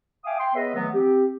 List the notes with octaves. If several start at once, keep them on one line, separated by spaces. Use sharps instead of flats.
E5 F5 G5 G#5 D6 D#6
G5 C6
B3 G#4 B4 C#5 D#5 E5
D#3 E3 F#3 A3 B3
C4 G4